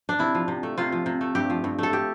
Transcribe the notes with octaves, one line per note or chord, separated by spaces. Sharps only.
D4
C3 E4
F3
C3
A3
C3 F4
F3
C3
A3
G2 G4
F3
G2
A3 A4
G4